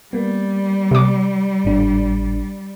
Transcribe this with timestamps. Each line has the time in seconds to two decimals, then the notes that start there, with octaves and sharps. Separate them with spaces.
0.13 G3 A#3 B3
0.91 C3 D6
1.65 G#1 A2 D4